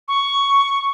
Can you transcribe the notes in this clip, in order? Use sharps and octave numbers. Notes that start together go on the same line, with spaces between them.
C#6